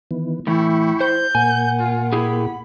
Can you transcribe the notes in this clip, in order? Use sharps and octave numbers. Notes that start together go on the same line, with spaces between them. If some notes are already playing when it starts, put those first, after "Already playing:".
D#3 E3 B3
A2 E3 E4 G5 B5 C#6
C5 G6
A#2 A#3 F#5 G#5
F4
E4 G4 G#4 B5